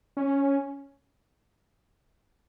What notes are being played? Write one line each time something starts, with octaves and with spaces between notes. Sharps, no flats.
C#4